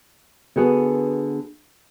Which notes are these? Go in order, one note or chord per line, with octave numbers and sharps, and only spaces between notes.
D3 B3 F#4 G#4